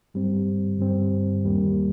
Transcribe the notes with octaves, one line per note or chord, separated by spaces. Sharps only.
G2 G3 C4
G2 G3 C4
D#2 D#3 G3 A#3